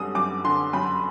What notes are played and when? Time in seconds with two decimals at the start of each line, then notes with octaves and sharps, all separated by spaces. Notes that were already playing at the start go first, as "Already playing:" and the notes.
Already playing: F#2 D3 G3 D#6
0.15 F#2 D6
0.44 D3 C6
0.73 F#2 B5